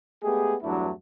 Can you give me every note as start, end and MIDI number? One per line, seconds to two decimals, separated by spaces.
0.23 0.56 56
0.23 0.56 57
0.23 0.56 59
0.23 0.56 67
0.23 0.56 68
0.63 0.91 40
0.63 0.91 43
0.63 0.91 54
0.63 0.91 57
0.63 0.91 62
0.63 0.91 64